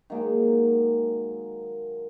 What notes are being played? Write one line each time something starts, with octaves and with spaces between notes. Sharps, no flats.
D#3 F#3 G#3 A#3